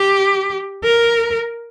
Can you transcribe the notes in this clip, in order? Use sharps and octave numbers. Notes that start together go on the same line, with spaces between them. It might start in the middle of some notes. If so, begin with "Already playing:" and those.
Already playing: G4
A#4